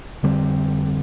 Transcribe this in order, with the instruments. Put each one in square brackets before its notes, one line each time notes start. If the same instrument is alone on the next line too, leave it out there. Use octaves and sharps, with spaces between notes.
[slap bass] F2 D3 G3 C4